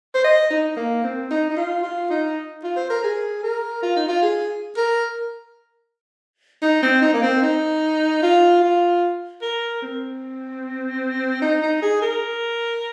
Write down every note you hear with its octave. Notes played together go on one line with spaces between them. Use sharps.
C5
D#5
D#4
A#3
C4
D#4
D#4
F4
F4
D#4
F4
C5
A#4
G#4
A#4
F4
D#4
F4
G#4
A#4
D#4
C4
D#4
A#3
C4
D#4
F4
F4
A#4
C4
D#4
D#4
G#4
A#4